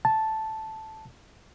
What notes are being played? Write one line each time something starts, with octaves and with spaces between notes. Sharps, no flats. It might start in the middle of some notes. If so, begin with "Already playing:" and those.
A5